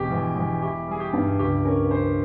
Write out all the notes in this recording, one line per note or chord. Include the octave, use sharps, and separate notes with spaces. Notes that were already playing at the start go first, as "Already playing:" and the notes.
Already playing: E1 G4
E2
E2
E4 G4
G3 G#4
G4
G2
C#2 G4
C#4 A#4
C#4 C5